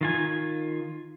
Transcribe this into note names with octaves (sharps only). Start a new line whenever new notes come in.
D#3 F4 G#5